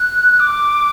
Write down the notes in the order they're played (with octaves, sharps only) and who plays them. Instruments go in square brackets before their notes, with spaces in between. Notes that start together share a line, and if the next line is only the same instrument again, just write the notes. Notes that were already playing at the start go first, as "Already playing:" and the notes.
Already playing: [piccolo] F#6
D6